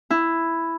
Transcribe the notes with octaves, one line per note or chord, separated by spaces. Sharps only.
E4